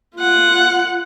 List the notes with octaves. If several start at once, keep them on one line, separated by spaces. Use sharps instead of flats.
F4 F#5